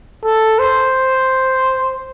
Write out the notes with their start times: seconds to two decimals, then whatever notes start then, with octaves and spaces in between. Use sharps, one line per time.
0.24 A4
0.59 C5